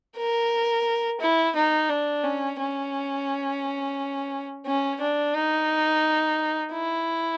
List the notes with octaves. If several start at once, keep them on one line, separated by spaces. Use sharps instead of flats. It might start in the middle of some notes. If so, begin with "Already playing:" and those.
A#4
E4
D#4
D4
C#4
C#4
C#4
D4
D#4
E4